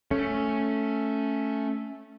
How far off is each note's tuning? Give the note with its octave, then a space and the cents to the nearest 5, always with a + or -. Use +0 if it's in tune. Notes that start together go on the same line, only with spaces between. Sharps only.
A3 +0 C#4 +0